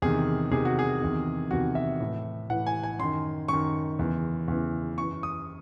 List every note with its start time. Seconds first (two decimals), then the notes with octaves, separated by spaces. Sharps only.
0.02 E2 C3 D#3 G#4
0.51 E2 C3 D#3 G#4
0.65 F#4
0.79 G#4
1.01 E2 C3 D#3
1.51 E2 C3 D#3 F#4
1.75 E5
2.01 A2 E3
2.50 A2 E3 F#5
2.66 G#5
2.83 G#5
2.99 F#2 D#3 C6
3.48 F#2 D#3 C#6
3.99 E2 C#3 E3
4.48 E2 C#3 E3
4.97 F#2 E3 C#6
5.23 D#6